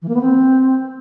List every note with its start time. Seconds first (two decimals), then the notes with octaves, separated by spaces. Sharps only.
0.02 E3
0.08 A#3
0.15 B3
0.21 C4